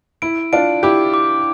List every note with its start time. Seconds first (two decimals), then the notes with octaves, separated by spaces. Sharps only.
0.22 E4 D7
0.53 D4 F4 D7
0.83 E4 G4 D6
1.14 D6